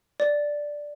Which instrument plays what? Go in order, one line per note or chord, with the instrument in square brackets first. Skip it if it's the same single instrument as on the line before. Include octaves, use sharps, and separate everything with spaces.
[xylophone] D5